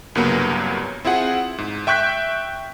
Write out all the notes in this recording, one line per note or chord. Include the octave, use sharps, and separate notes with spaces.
C2 G2 C#3 F#3 A#3 B3
C4 E4 F4 G#4 F#5
G#2
E5 G5 C#6 F#6 G6 B6